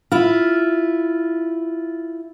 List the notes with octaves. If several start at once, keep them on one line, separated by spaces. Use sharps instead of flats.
E4 F4